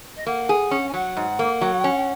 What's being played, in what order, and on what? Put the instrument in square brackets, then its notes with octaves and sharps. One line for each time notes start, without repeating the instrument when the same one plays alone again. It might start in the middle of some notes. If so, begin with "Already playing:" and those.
[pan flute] D#5
[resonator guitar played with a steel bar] A#3 [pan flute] F#5
[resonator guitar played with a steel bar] G#4
C#4
[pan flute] G#5
[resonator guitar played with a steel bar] F#3 [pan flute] F#5
[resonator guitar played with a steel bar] G#2
A#3
F#3
C#4